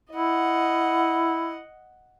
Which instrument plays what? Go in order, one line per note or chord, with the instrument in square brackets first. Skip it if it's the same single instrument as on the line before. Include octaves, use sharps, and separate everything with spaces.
[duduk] E4 [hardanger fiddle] D#5 F#5